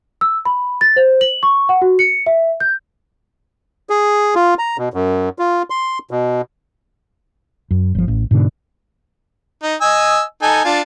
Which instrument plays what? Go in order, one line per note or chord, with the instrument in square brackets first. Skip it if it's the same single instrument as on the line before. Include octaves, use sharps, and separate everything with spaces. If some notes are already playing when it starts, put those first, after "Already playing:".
[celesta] E6
B5
A6
C5
F#7
C#6
F#5
F#4
C#7
E5
G6
[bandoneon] G#4
F4
A#5
B2
F#2
F4
C6
B2
[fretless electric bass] F#2
G1 F3
A1
G#2 B2 D3
[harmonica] D#4
D#5 G#5 E6
D#4 A4 G#5
D4 F4